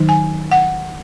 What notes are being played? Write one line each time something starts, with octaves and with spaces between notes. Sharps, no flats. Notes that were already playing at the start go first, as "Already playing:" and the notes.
Already playing: D#3 F#3 D#4
G#5
F#5